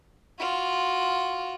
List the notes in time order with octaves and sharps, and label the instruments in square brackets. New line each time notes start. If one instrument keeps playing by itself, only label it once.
[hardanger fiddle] F4 F#4